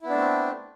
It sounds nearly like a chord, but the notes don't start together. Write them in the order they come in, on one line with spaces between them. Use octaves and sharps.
E4 B3 D4 A3 C4